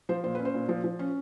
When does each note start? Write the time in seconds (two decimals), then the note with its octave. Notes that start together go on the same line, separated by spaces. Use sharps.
0.09 F3 C5
0.24 A#2 C5
0.35 C#4 B4
0.45 C5
0.54 A#2
0.69 F3
0.84 F3
0.99 C#4